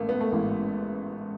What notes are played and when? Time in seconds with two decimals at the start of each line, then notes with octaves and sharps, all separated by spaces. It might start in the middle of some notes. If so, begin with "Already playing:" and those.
Already playing: A1 G#2 A3 A#3
0.09 B3
0.21 A3
0.32 A1 G#2 E3 A#3